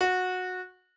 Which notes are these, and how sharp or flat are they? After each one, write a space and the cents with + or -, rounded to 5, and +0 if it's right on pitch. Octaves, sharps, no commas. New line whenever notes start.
F#4 -15